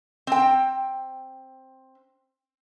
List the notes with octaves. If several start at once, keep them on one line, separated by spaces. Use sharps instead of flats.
C4 G5